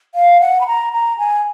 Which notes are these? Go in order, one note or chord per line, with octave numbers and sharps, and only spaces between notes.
F5
F#5
B5
A#5
A#5
G#5